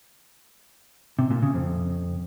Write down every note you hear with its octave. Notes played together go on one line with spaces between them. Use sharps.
C3
A#2
C#3
F2